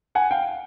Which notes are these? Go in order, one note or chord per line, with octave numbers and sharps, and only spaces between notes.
F#5 G#5
F5 G5